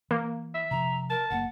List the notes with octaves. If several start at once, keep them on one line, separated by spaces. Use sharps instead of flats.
E3 A#3
E5
C3 D#3 F3 A#5
A#4 A5
F#1 A#2 A#3 F#5